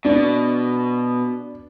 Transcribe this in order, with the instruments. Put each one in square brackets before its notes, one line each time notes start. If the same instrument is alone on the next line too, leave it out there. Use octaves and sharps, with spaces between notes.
[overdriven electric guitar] B2 [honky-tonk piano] D4